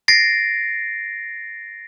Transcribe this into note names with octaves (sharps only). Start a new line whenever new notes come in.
A6 A#6 C7 D7